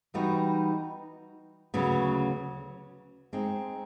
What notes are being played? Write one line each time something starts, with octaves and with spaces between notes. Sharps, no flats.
E3 G3 B3 D#4 F#4
D2 C#3 F#3 B3
G#3 C4 D#4